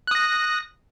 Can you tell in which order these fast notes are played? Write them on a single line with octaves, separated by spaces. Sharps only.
F#6 D#6 A#6